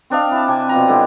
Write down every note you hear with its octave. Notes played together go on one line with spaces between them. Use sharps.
C4 D4 D#5 F5
E4 A5
C3 D5 G5 G#5
B2 F3 A#5
D3 G#3 E4 G4